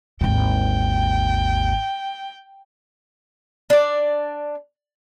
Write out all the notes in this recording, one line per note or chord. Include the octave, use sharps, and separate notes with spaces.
G#1 D#2 D3 G5
D4 D5